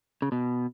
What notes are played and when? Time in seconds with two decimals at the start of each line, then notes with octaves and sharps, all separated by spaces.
0.22 C#3
0.32 B2